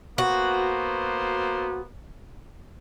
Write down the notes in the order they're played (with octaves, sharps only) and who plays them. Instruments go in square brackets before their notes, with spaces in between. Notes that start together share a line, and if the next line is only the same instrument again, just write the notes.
[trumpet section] A#3 B3 C5 [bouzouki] F#4